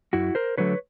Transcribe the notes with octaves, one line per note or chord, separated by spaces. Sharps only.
F#2 E4 F#4
A#4 C5
D3 F#3 A3 B4 C#5